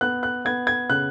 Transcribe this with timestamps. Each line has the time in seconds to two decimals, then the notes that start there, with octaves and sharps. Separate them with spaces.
0.01 B3 F#6
0.23 F#6
0.45 B3 G#6
0.67 G#6
0.89 C#3 F#6